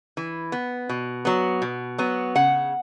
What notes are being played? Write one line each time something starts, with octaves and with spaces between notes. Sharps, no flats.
E3
B3
B2
F#3 B3
B2
F#3 B3
C#3 F#5